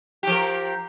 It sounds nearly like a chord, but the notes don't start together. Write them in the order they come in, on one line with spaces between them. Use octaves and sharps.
G4 F3 A#4